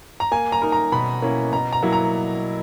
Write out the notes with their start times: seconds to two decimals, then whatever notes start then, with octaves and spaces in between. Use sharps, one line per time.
0.20 A#5
0.32 A#3 G#5
0.52 A#5
0.62 D#4 A#4
0.72 A#5
0.92 B2 B5
1.22 A#3 C#4 E4
1.53 B2 A#5
1.73 A#5
1.82 F#3 A#3 E4
1.93 A#5